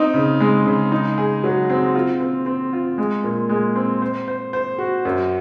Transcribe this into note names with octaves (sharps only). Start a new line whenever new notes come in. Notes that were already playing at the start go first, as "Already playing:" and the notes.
Already playing: C4 D#4
C#3
G#3
C#3
D#4
G#4
F#3
C4
F4
C4
C4
F4
G#3
A#2
G#3
C4
C5
C5
C5
F#4
F#2